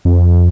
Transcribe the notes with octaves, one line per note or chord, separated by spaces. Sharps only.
F2